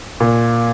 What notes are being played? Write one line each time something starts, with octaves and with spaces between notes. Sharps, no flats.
A#2